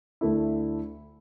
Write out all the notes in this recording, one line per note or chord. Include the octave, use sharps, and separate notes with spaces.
D2 D3 A3 E4